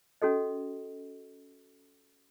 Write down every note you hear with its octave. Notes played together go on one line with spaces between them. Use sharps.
C#4 F#4 A4 D#5